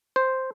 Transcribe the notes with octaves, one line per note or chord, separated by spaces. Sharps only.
C5